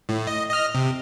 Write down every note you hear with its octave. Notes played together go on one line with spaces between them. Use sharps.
A2
D#5
D#5 F6
C3